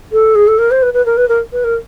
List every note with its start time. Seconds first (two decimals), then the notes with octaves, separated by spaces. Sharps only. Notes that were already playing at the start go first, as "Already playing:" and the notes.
0.12 A4
0.35 G#4
0.47 A4
0.58 A#4
0.71 C5
0.82 B4
0.93 B4
1.05 A#4
1.17 B4
1.28 A#4
1.52 B4
1.64 A#4